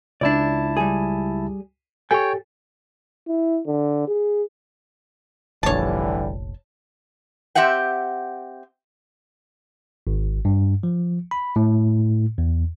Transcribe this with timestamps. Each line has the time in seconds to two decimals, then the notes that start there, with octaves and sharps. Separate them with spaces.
0.21 C#2 D4 E4 D5 A5
0.77 G3 G#4
2.11 G4 A4 C#5 G5 G#5
3.28 E4
3.66 D3
4.08 G#4
5.63 F1 A#1 D3 E3 G3 C#5 A5
7.55 C4 G4 E5 F#5 G5
10.07 G#1
10.45 G2
10.83 F3
11.31 B5
11.56 A2
12.38 E2